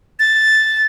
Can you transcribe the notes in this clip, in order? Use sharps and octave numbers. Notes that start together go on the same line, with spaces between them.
A6